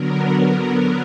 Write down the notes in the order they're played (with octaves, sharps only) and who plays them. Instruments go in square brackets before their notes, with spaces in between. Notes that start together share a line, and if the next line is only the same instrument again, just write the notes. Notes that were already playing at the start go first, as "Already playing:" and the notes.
Already playing: [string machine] D3 F#3 B3 A#4